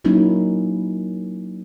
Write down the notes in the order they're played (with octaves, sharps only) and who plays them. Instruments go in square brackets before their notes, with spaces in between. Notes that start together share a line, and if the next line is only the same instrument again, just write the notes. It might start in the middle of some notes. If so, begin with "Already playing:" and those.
[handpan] F#3 A#3 C#4 D#4 E4 F#4